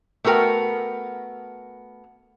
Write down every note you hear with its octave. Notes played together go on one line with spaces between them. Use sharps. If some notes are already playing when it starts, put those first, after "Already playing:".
A3 B3 F#4 A#4 G5